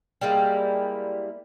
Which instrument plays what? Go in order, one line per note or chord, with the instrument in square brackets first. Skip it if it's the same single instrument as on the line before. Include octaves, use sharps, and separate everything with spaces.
[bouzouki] G3 G#3 A#3 E4